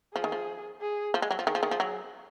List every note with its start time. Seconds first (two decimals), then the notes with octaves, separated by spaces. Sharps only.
0.15 F3 G#4
0.24 D#3
0.32 F3
0.82 G#4
1.14 F3
1.22 G#3
1.31 F#3
1.39 F3
1.47 D#3 G#4
1.55 F3
1.63 D#3
1.71 F3
1.80 F#3